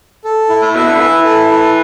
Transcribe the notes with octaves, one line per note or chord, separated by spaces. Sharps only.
A4
E4
A2
B2 E5
D3
E3 E4
A4
E4